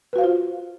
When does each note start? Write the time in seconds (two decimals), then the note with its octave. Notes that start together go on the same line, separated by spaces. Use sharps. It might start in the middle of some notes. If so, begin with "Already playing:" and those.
0.13 B4
0.16 F#4
0.18 F5
0.21 C5
0.24 F4